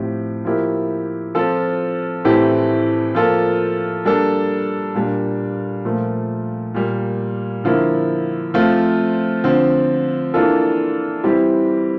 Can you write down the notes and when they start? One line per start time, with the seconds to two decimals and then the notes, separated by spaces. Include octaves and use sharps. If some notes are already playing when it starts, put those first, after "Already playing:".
Already playing: A2 F3 C4 G4
0.45 F3 A#3 E4 G4
1.35 F3 C4 F4 A4
2.24 A2 E3 A3 C4 G4
3.15 F3 A#3 F4 A4
4.05 G3 A#3 D4 A4
4.95 A#2 G3 A#3 D4
5.85 A#2 F3 A3
6.74 A#2 G3 A#3
7.64 D3 F3 A#3 E4
8.54 F3 A3 C4 F4
9.44 D3 F3 C4
10.34 E3 A#3 D4 F4 A4
11.23 E3 G3 C4 E4 G4